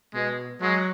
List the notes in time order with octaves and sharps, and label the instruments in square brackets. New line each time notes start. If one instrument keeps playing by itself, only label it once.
[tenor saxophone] B2 [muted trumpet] G#3
[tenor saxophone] F#3 [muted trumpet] G#3